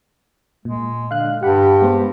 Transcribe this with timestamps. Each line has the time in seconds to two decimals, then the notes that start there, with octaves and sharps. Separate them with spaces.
0.65 A#2 G#3
1.11 D3 F5 F#6
1.43 G2 G4 F#5 B5
1.82 G#3 B3 C5